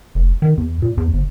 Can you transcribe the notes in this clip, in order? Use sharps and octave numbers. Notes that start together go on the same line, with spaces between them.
F1
D#3
E2
A#2
E2
G1